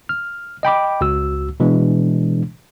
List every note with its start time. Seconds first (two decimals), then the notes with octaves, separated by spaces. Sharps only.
0.09 F6
0.63 D#5 G5 B5 D6
1.01 C#2 F#4 E6
1.60 B2 E3 G#3 D4